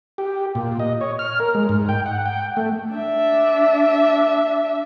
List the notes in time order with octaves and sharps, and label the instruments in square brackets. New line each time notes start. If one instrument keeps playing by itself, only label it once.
[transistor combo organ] G4
A#2
D#5
C#5
F6
A#4
G#3
G#2
G5
F#5
G5
A3
[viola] D4 E5